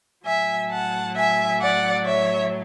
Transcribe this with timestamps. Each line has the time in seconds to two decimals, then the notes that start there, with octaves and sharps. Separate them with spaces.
0.25 A2 F#3 E5 G#5
0.70 F#5 A5
1.16 E5 G#5
1.60 D5 F#5
2.05 C#5 E5